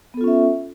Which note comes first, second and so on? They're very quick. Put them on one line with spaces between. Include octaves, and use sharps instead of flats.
B3 A4 F4 C#4 E5